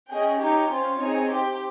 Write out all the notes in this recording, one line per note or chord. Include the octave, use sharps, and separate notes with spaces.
C#4 G#4 D#5 G5
D#4 G4 C#5 G5
C#4 F4 C5
C4 D#4 G#4 C#5 G#5
G4 C5 G5